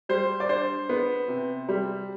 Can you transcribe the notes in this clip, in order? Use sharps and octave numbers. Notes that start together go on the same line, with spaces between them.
G3 C5
D5
D4 C5
B3
C3
G3